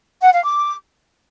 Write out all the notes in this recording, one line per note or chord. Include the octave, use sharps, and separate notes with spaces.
F#5
F5
D6